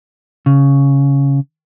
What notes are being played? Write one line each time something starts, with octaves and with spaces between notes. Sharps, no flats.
C#3